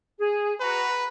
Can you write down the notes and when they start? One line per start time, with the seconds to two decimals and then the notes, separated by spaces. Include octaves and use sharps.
0.19 G#4
0.60 F#4 B4 A#5